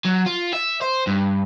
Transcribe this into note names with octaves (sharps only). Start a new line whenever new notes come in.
F#3
F4
E5
C5
G2